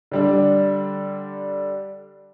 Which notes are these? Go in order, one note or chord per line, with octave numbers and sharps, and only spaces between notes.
D3 G3 D4